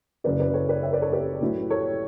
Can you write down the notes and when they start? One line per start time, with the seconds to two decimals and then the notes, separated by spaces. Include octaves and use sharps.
0.24 F#1 F#2 C#3 B4 D5
0.39 B4 D5
0.54 A4 C#5
0.69 B4 D5
0.83 C#5 E5
0.93 B4 D5
1.02 A4 C#5
1.12 G4 B4
1.41 A2 F#3 A3 E4
1.70 A4 C#5